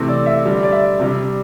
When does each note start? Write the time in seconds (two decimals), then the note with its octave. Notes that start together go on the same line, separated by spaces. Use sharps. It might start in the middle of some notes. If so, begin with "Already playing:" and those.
Already playing: C3 E3 A3 C4
0.08 D5
0.26 E5
0.45 D3 G3 D4
0.63 D5
0.72 E5
0.99 C3 G3 D4